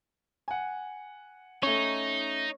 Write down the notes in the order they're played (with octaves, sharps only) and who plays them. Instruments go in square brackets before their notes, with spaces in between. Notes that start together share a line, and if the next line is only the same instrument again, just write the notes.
[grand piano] F#5 G#5
[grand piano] A3 C#4 [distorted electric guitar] D#4 [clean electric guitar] C#5